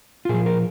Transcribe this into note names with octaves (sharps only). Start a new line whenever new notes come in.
F4
A#2 F3 G#4
A#4